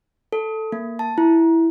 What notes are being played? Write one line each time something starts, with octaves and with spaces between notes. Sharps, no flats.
A4
A#3
A5
E4